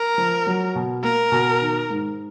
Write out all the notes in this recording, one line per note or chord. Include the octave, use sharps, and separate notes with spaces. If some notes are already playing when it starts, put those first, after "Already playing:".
Already playing: A#4
F3
F#3
B2
A#3 A#4
B2
D#3
G#2